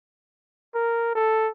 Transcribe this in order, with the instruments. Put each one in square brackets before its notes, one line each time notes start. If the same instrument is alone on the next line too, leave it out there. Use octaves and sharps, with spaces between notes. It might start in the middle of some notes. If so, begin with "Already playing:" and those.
[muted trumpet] A#4
A4